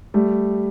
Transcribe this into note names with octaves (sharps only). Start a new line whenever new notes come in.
G3 A3